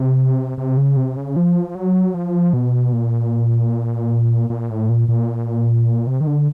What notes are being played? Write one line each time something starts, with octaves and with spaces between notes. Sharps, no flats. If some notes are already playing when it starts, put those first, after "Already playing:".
Already playing: C3
C3
C#3
C3
C#3
F3
F#3
F3
B2
A#2
A#2
A2
A#2
A#2
C3
D#3
D3